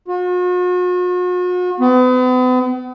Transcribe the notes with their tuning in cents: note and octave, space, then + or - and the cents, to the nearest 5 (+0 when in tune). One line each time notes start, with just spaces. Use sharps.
F#4 -45
B3 +40